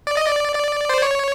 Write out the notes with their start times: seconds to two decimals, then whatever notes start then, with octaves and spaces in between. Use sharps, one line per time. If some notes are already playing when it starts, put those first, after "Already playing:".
0.07 D5
0.17 D#5
0.27 D5
0.55 D5
0.89 C5
1.02 C#5